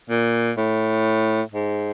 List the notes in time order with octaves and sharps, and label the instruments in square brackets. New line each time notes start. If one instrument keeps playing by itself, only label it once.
[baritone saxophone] A#2
A2
G#2